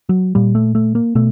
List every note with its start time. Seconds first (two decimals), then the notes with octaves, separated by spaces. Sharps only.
0.09 F#3
0.35 A#2 G3
0.55 A3
0.75 A3
0.95 A#3
1.15 B2 A3